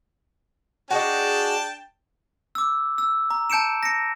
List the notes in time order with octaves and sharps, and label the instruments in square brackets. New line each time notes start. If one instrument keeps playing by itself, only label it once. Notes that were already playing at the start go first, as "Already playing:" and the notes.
[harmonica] D4 G5 A5 [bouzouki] F#4 G#4 D#5
[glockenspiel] D6 E6
E6
A#5
A5 G6 C#7 D7 E7
A#6 C#7